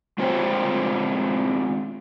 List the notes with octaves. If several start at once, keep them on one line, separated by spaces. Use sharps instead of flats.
G#3 C4 F4 C5 C#5 G5